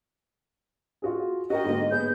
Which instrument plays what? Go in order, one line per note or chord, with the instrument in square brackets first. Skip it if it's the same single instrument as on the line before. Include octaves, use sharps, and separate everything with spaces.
[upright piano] F4 F#4 G#4
[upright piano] F#4 A#4 G5 [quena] D#5
[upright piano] G#2 D3 A#3
[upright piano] B3 G#4 B4 [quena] G6